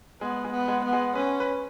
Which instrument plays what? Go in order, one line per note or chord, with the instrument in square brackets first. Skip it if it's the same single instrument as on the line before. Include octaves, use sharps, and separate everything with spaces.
[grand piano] G#3 [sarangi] B3
[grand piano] G#3
[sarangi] B3
[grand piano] G#3
[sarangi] B3
[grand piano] G#3
[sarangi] C#4 [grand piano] B4
[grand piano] B4